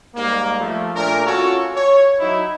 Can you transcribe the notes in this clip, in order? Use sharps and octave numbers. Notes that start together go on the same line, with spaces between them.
G#2 G3 A#3
F3 A3
A#2 A3 D4 A#4
C#4 F4 F#4 A4 C#5
C#5
F#3 D#4 E4